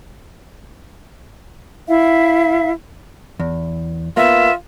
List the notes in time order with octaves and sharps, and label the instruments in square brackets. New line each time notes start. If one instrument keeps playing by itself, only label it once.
[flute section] E4 E5 F5
[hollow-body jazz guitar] E2
[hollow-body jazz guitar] A#3 B3 [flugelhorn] F4 [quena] E5